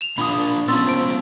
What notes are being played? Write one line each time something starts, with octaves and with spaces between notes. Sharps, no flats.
E7 F7
A#2 D4 F4 B5 D#6
B3 C#4 F4 C6 E6 A6
C5 D7